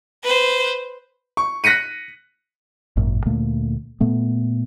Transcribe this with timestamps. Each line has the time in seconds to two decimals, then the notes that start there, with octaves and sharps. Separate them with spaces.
0.23 B4 C5
1.37 C#6
1.64 F#6 A#6 B6 C#7 D#7
2.96 G#1 F#2 A#2
3.26 D2 A#2 A3 A#3
4.00 A#2 A3 B3